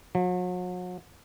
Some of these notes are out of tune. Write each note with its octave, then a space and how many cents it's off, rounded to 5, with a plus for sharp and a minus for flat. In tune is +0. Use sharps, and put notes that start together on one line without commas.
F#3 -40